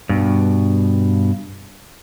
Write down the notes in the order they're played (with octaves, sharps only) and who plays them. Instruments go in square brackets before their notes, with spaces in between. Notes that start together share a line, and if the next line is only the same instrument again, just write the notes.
[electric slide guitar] G2 B2